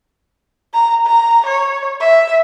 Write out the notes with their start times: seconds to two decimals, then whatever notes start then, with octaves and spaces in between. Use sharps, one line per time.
0.73 A#5
1.06 A#5
1.46 C#5
2.00 E5